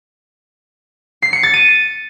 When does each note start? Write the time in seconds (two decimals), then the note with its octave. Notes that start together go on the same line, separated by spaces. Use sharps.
1.22 C7
1.33 C#7
1.43 A6
1.54 D#7